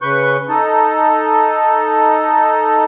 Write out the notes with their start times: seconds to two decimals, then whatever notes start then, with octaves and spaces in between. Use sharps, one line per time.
0.02 C#3 B4 C#6 G6
0.49 D#4 A4